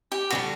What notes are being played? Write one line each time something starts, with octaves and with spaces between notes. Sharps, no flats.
G4
D3 G3 F#4